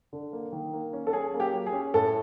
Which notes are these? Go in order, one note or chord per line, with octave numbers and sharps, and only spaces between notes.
D3
A#3
D#3
A#3
C#4
A4
C#4 G#4
A#3
G4
F#3
G#4
C#4
A2 A4